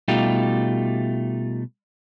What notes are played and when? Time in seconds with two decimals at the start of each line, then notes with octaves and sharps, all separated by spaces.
0.08 B2 G3 A3 D#4 F4 G4